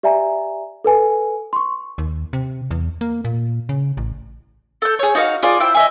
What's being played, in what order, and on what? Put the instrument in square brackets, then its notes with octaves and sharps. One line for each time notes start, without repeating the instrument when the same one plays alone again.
[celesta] G4 D5 E5 G#5 A#5
A4 B4 G#5
C6 C#6
[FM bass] D#2
C3
E2
A#3
A#2
C#3
A1
[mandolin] A4 G6
G#4 C#5
D#4 F#4 C#5 F5
F4 G#4 D5
E4 C5 E5 G5
D#5 E5 G#5